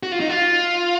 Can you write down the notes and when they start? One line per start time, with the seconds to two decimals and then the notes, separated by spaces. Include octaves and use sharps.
0.03 F#4
0.12 F4
0.20 D#4
0.29 F4